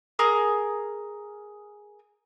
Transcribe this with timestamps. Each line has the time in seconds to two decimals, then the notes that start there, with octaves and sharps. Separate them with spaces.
0.19 G#4 A#4 D#6